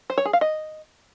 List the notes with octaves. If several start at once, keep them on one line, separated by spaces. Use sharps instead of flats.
C5
C#5
G#4
F5
D#5